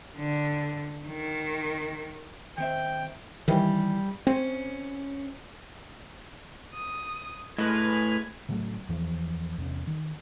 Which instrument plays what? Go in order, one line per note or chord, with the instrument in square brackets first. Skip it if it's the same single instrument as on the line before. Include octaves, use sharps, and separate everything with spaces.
[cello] D3
D#3
[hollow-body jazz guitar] D#3 C4 E5 [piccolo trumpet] G5
[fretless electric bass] D#3 E3 [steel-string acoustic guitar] G3
[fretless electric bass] C4 [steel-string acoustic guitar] C#4
[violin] D#6
[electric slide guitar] A2 [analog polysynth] G#3 B4 F6 [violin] G#6
[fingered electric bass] A2 C#3 F#3 A3
E2 E3 F3
E2 C3 C#4
D#3